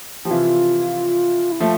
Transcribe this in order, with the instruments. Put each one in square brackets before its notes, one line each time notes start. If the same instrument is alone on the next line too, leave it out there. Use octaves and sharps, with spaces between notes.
[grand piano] F3 [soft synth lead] G4
[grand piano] C3 E3 [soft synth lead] F4
[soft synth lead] E4
[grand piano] F3 A3 [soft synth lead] F4